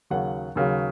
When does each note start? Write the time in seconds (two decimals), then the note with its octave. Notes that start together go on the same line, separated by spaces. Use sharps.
0.10 D#2 C#3 F#3 F#5
0.56 D#2 C#3 F#3